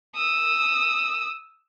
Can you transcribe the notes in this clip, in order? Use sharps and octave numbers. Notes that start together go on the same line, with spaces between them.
D#6 E6